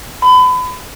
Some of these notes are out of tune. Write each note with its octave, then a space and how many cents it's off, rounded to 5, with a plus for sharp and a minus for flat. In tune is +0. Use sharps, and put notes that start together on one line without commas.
B5 +30